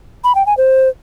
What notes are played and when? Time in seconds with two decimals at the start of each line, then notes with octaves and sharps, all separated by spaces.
0.24 B5
0.35 G5
0.46 G#5
0.57 C5